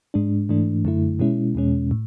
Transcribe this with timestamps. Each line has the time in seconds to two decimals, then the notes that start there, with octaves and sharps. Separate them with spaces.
0.14 G#2 G#3 D4
0.49 G#2 E3 A3 D4
0.85 F#2 D3 A3 E4
1.19 B2 G#3 C#4 E4
1.55 E2 B2 G#3 C#4
1.91 A2